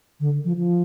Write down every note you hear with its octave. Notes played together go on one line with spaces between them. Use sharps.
D3
F3
F3